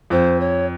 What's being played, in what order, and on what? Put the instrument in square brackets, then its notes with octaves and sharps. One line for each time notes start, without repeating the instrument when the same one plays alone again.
[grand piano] F2 [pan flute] C5
[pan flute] C#5